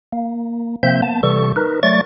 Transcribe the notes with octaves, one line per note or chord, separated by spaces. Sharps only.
A#3
C3 F3 A#3 C4 E5 G6
A#3 B3 A5
C3 E3 G3 A4 C#6
D#4 A#4 B4
F#3 A3 D5 C#6 A6